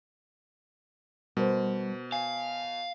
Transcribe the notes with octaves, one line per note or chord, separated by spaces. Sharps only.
B2 G3 A#4 C5
F5 G#5